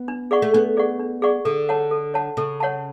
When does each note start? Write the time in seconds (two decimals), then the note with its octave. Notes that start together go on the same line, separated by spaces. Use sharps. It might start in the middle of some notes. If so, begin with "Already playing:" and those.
Already playing: B3
0.08 D4
0.31 G#4 D5 F#5 C#6
0.42 A3
0.54 B3 D4
0.77 G#4 D5 F#5 C#6
1.00 D4
1.22 G#4 D5 F#5 C#6
1.45 D3 A4
1.69 C#5 F#5 A5
1.91 A4
2.14 C#5 F#5 A5
2.37 C#3 A4
2.60 C#5 F#5 A5